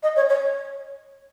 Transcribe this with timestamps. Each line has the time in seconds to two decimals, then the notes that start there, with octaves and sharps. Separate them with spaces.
0.03 D#5
0.16 C#5
0.29 C#5